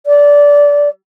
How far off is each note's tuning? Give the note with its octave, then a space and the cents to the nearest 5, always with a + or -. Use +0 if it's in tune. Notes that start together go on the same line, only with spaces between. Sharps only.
D5 -20